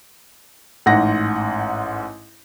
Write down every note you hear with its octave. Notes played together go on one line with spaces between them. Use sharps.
A1 G#2 F#5 A#6